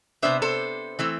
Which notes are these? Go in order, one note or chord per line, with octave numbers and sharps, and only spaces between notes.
C3 G#3 B3 D4 C5 E5
A4 C5
E3 A3 C4 E4